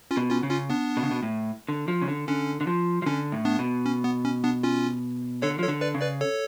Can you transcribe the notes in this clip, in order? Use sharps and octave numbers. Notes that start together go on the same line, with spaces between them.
C#4 F4
B2
C#4 F4
C#3
C#4 F4
B3 D4
B2
C#3
B2
A2
D3
F3
C#3
D3
D3 C#4
D3
F3
F3
D3 C#4
A2
B3 D4
B2
C#4
B3
C#4
B3 D4
C#4 F4
D3 A4 C#5
F3 A4 C#5
D3
B4 D5
C#3
B4 D5
A4 C#5